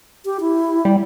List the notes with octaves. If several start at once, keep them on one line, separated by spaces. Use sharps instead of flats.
G4
E4
G3